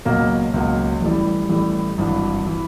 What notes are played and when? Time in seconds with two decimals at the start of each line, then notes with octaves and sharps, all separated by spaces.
0.05 C#2 B2 F#3 A#3
0.54 C#2 B2 F#3 A#3
1.01 A1 A2 E3 G3
1.49 A1 A2 E3 G3
1.98 G#1 G2 E3
2.46 E3